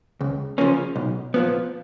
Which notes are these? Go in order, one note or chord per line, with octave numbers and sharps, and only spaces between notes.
C#2
C#3 F3 A#3 C#4
B1
A#2 F3 B3